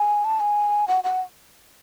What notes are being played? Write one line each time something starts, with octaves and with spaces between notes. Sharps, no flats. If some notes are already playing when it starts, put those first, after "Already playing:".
Already playing: G#5
A5
G#5
F#5
F#5